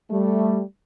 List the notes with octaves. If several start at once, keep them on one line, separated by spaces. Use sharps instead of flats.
G3 A3